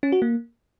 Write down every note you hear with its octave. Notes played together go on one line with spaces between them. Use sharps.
C#4
F#4
A#3